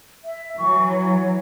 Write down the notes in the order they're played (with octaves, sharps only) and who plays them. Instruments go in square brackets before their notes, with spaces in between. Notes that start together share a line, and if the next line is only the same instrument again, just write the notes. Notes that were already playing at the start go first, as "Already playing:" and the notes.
[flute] E5
[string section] E3 F#3 [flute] C#6
[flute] C#5